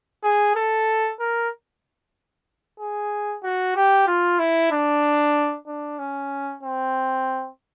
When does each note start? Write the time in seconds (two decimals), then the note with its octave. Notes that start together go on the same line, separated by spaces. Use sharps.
0.23 G#4
0.56 A4
1.20 A#4
2.79 G#4
3.43 F#4
3.76 G4
4.07 F4
4.39 E4
4.71 D4
5.67 D4
5.99 C#4
6.63 C4